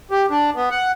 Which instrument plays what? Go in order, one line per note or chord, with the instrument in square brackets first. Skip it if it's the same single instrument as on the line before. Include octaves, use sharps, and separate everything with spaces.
[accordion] G4
D4
B3
F#5